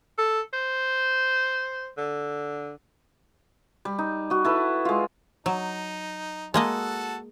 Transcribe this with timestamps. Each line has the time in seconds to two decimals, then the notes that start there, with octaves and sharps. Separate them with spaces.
0.18 A4
0.53 C5
1.97 D3
3.85 G3
3.99 D#4
4.30 F#4 D#5
4.45 E4 A4 B4
4.85 G#3 F4
5.46 F#3 D#4
6.54 G#3 A#3 F#4 A4 D#5 A5